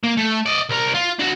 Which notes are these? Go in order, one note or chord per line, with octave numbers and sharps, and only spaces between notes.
A#3
A3
D5 D#5
C2 A#4
F4
D4 F#4